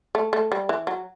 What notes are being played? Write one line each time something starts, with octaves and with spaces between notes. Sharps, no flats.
A3
A3
G3
E3
F#3